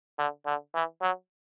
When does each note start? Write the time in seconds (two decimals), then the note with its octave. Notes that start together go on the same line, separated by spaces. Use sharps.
0.19 D3
0.46 D3
0.74 E3
1.02 F#3